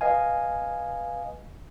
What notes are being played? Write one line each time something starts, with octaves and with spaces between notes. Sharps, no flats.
B4 D#5 F5 G#5